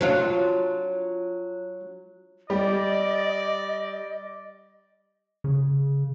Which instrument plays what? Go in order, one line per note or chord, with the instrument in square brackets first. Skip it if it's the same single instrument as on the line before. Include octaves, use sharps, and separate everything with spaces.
[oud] F#3 D4 F4
[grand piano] G3 G4 [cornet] D5 [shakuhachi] D#5
[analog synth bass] C#3